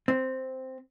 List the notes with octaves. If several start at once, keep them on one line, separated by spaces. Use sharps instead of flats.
C4